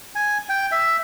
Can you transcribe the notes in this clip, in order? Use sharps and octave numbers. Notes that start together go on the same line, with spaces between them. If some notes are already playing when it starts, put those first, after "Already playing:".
G#5
G5
E5